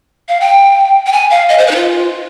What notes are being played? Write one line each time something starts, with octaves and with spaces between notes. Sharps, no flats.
F5
G5
G5
G#5
F5
D#5
C5
B4
D#4
F4